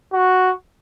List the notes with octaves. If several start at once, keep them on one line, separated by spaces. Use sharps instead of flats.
F#4